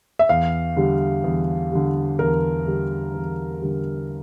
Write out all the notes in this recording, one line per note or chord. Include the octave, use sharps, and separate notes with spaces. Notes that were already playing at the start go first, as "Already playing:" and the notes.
E5
E2 F5
D3 G3
E2
D3 G3
E2 A#4
D3 G3
E2
D3 G3